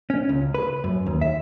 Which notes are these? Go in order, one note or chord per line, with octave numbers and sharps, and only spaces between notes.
C#4
C#2
B4
F#2
D#2
E5